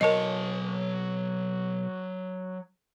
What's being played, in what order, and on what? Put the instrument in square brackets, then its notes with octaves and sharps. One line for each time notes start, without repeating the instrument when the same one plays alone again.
[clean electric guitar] B1 C#5 [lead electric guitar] F#3 A5 [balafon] A#4 D#5